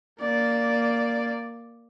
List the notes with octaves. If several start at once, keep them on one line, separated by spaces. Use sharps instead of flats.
A#3 D5